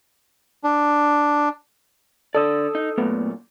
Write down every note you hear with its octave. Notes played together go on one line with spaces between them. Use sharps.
D4
D3 A4 D5 D#6 E6
D#4
F#2 A#2 A3 B3